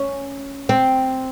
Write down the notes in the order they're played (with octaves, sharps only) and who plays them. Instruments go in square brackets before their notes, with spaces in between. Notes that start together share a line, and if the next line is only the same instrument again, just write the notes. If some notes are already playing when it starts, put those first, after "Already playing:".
Already playing: [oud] C#4
C4